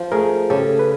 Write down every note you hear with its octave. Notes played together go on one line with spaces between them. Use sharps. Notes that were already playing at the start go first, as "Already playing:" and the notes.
Already playing: F3
A3 G#4 A#4
C#3 G4 A4
B4